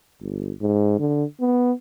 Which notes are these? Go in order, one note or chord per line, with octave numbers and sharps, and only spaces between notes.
G1
G#2
D3
B3